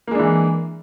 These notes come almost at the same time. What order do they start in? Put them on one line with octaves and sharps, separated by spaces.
A#3 G#3 D4 E3